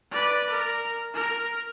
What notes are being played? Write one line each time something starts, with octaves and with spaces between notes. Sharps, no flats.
B4 D5
A#4
A#4